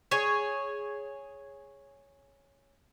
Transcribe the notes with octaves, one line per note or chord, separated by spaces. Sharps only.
G#4 C#5